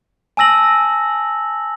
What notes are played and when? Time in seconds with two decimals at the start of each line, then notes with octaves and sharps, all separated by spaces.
0.37 G#5 A5 E6 A#6 F#7